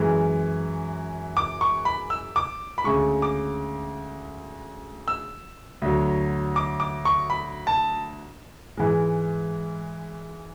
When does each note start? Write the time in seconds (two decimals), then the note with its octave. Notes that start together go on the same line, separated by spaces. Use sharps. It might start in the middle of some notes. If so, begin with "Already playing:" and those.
Already playing: F#2 E3 G#3
1.37 D6
1.61 C#6
1.85 B5
2.10 E6
2.36 D6
2.78 B5
2.84 D2 C#3 G#3 C#6
3.22 D6
5.08 E6
5.82 D2 D3 F#3
6.56 D6
6.80 D6
7.05 C#6
7.30 B5
7.67 A5
8.77 G#2 E3 G#3